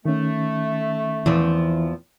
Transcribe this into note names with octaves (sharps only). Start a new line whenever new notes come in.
D#3 A3 C#4
E2 E3 F3 C4